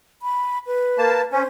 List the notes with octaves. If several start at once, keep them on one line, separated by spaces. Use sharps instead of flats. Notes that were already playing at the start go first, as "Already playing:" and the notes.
B5
B4
A#3 A5
C#4 C5